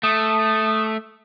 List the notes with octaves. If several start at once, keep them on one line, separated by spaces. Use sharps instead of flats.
A3 D#6